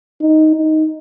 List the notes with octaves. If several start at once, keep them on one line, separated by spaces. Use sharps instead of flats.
D#4
D#4